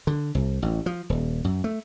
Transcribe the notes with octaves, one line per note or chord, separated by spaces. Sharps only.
D3
C2
A1
F3
D#1
F#2
A3